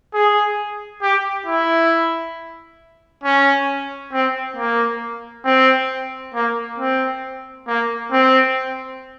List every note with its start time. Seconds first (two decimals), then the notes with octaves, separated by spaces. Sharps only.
0.14 G#4
1.02 G4
1.46 E4
3.24 C#4
4.13 C4
4.56 A#3
5.45 C4
6.35 A#3
6.78 C4
7.67 A#3
8.12 C4